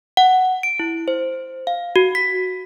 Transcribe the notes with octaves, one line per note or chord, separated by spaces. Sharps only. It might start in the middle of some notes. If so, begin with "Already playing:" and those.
F#5
D7
E4
C5
F5
F#4
B6